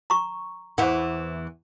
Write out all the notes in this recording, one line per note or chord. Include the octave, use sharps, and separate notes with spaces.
A#5 C#6
E2 E3 C5 E5 F#5